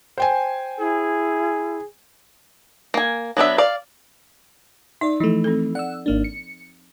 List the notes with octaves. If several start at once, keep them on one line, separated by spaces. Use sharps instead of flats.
C5 G5 G#5
E4 G#4
A#3 G#5
F#3 B3 D4 E5
D5 F5
D#4 D5 E5
E3 F3 A3
C4 A4
D5 F#5 E6
G#1 A#3 D4
C#7